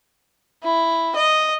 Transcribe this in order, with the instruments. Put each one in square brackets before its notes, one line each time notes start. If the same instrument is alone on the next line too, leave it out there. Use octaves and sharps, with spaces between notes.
[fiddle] E4
D#5